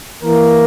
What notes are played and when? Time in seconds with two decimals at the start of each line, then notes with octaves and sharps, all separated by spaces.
0.22 E3 A#3 A#4